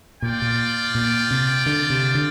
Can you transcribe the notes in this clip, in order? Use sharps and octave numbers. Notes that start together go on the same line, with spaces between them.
A#2 F4 D5 G5
A#2
A#2
C3
D3
C3
D3